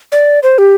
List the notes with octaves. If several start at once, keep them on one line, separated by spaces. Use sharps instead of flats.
D5
C5
G4